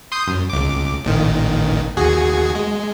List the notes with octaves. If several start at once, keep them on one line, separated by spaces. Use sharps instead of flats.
C6 D#6 G6
F#2
C#2 D6
A1 A#2 D#3
D#2 F#4 G#4
G#3